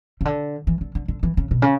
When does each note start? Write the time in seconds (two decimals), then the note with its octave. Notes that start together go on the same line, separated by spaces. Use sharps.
0.21 C#3
0.25 D3
0.67 E3
0.81 D3
0.95 D3
1.08 D3
1.23 E3
1.37 C#3
1.51 B2
1.62 C#3